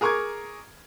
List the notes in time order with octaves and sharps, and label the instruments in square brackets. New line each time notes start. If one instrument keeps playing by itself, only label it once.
[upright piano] G#4 A#4 A#5 C#6 D6 G#6